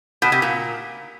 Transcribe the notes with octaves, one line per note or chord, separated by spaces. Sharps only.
B2
C3
A#2